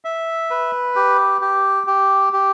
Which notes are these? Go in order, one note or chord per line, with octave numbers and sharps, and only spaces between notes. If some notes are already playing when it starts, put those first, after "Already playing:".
E5
B4
G4
G4
G4
G4